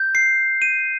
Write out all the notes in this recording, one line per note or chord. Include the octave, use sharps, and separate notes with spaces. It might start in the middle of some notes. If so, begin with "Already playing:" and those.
Already playing: G6
C7
D#7